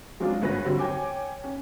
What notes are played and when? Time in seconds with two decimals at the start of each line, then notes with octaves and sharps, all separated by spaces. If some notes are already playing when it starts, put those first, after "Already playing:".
0.20 F#3 G#3 C4 D4 F4
0.41 D2 G2 B4 C#5 A#6
0.65 D3 F#3 G3 C4 F#4
0.79 C#5 G5 G#5 D6
1.44 C#4